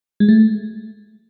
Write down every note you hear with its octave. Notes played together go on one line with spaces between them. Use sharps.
G#3
A3